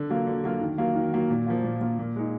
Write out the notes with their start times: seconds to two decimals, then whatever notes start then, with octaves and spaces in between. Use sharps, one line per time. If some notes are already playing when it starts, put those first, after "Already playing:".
Already playing: D3
0.10 F#3 A#3 F4
0.27 D3
0.44 F#3 A#3 F4
0.61 D#3
0.78 F#3 A#3 F4
0.95 D#3
1.13 F#3 A#3 F4
1.30 A#2
1.46 F3 A#3 F4
1.64 A#2
1.81 F3 A#3 F4
1.99 A#2
2.16 G#3 D#4